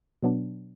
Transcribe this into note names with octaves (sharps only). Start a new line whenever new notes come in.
B2 F#3 B3 D4